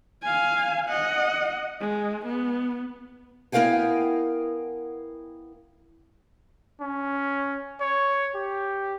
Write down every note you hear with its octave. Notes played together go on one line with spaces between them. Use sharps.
F5 G#5
D#5 F#5
G#3
B3
B3 E4 A#4 F5 G5 G#5
C#4
C#5
G4